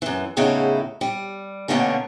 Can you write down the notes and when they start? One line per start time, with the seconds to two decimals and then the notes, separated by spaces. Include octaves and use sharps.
0.02 F#2 E3
0.37 E2 A2 C#3 D#4 E4 F#4
1.01 G3
1.68 F2 B2 D3 A3 A#3 C#4